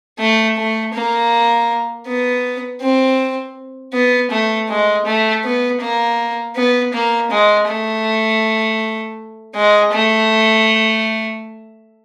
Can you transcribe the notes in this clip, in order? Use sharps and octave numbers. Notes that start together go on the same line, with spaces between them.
A3
A3
A#3
B3
C4
B3
A3
G#3
A3
B3
A#3
B3
A#3
G#3
A3
G#3
A3